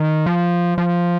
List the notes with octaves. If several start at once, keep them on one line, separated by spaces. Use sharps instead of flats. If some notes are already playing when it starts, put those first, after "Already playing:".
Already playing: D#3
F3
F3